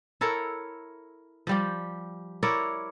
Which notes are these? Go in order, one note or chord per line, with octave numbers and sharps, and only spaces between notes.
E4 A4 A#4 C#5
F3 G3 G4
E4 A#4 C#5 D5